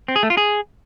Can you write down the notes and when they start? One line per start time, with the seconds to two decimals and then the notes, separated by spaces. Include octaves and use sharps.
0.08 C4
0.16 G#4
0.23 A3
0.30 F4
0.37 G#4